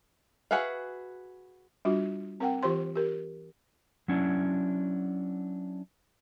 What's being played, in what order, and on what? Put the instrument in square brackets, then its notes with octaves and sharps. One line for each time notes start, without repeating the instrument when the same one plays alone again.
[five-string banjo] F#4 G#4 B4 E5 F5
[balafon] G3 D4 F4 F#4
C4 A#4 F#5 G5
E3 F4 G4 C5 C6
G4 A#4
[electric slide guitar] F#3 C#4 D4 E4